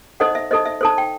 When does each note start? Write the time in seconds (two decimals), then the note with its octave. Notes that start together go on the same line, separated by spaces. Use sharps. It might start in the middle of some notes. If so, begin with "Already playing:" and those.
0.20 D#4 A4 C5 D#5 F#5
0.35 E5
0.51 D#4 A4 C5 D#5
0.66 E5
0.81 D#4 A4 C5 A5
0.98 G5